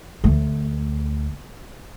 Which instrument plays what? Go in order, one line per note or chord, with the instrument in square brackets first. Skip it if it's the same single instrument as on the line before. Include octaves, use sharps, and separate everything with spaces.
[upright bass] D2 A3